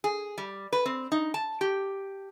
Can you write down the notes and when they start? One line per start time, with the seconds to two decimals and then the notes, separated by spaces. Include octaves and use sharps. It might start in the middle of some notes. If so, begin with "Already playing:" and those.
0.04 G#4
0.38 G3
0.72 B4
0.85 C4
1.12 D#4
1.34 A5
1.61 G4